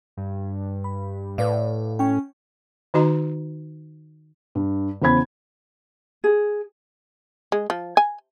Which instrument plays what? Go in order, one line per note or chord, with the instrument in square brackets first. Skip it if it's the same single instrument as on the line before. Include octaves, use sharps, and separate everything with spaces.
[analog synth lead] G2
[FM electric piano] B5
[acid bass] A2 [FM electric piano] B4 D5 F5
[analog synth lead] C#4 [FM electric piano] G5 C#6
[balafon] D#3 D#4 F#4 D#5 A#5
[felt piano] G2
E2 C#3 C5 B5 G#6
[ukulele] G#4
[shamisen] G#3
F3
G#5